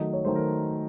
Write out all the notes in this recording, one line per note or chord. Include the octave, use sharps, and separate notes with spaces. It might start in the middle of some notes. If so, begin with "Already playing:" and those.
Already playing: D#3 F#3 A3 D#5
C#5
D#3 F#3 A3 C5
A#4